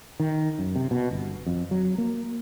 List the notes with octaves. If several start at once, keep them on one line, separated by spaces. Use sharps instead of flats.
D#3
F#2
C3
B2
G1
F2
F#3
A#3